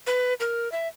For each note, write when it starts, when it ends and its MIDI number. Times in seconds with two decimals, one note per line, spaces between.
0.07 0.34 71
0.40 0.71 70
0.72 0.87 76